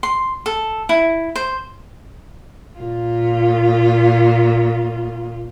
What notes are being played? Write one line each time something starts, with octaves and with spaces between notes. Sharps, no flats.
C6
A4
E4
C5
A#2 F4